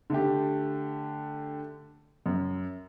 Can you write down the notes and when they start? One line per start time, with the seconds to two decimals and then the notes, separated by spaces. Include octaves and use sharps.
0.10 D3 A3 G4
2.26 F#2